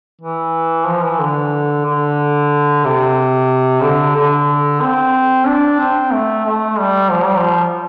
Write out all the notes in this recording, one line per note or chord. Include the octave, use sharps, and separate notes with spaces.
E3
F3
E3
D3
D3
C3
D3
D3
C4
D4
C4
A3
A3
G3
F3
G3
F3